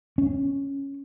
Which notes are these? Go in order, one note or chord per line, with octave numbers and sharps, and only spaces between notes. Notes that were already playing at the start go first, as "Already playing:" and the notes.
C#4